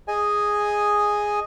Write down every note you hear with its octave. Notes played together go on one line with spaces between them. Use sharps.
G#4 D#5 G#5